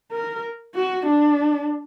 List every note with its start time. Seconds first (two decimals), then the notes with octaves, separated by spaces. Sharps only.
0.12 A#4
0.75 F#4
1.06 D4